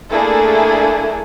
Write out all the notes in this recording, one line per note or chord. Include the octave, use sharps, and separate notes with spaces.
A3 A#3 D4 E4 G#4 A4